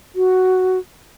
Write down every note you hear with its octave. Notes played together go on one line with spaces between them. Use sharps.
F#4